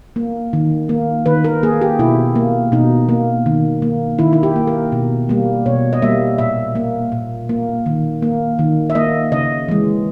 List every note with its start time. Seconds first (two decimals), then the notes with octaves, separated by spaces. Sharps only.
0.16 A#3
0.53 D#3
0.89 A#3
1.26 D#3 B4
1.44 A#4
1.63 A#3 G#4
1.81 G4
1.99 B2 E4
2.35 A#3
2.72 B2 D#4
3.09 A#3
3.46 D#3
3.82 A#3
4.19 D#3 E4
4.33 E4
4.43 G4
4.56 A#3
4.67 A#4
4.92 B2
5.29 G3 A#3
5.66 B2 C#5
5.93 D#5
6.02 G3 A#3 E5
6.38 A#2 E5
6.75 A#3
7.12 A#2
7.49 A#3
7.86 D#3
8.22 A#3
8.59 D#3
8.90 E5
8.95 A#3 D#5
9.32 C#3 D#5
9.68 E3 G#3